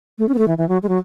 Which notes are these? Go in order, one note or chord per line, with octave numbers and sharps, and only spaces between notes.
A3
C#4
B3
A3
E3
E3
F#3
G#3
F#3